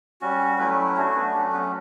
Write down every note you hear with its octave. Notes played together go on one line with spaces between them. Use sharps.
G3 C#4 F#4
F#3 A3 C#4 E4 B4 B5
A3 C#4 D4 F#4 C#5
B3 B4
F#3 A3 C#4 G4
B3 B4